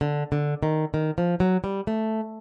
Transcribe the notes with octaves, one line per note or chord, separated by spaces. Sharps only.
D3
D3
D#3
D#3
F3
F#3
G3
A3